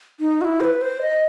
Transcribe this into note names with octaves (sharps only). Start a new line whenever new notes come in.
D#4
F#4
E4
C5
B4
C5
D#5